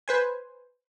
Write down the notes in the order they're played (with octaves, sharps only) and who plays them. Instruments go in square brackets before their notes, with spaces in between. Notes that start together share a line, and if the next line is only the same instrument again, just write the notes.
[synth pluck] B4 C5 G#5